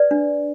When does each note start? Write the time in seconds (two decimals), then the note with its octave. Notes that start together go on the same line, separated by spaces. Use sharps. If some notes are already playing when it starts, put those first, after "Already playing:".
Already playing: B4 D5
0.11 D4